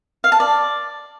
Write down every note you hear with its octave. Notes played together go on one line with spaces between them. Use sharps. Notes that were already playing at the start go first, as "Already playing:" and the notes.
F5
A5
D5